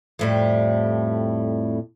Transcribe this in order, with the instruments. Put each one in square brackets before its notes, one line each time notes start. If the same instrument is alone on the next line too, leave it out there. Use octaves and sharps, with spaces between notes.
[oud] F2 A2 G3